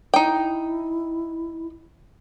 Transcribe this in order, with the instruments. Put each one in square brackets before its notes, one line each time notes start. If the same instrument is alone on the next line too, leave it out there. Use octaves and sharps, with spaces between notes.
[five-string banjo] D#4 G5 [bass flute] E4